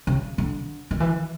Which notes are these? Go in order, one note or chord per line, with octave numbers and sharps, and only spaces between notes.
C#3
D3
D#3
E3